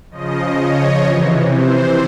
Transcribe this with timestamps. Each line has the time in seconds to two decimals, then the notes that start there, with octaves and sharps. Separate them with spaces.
0.11 C#3 F3 D#5
0.58 C#5
1.04 C3 E3
1.51 C5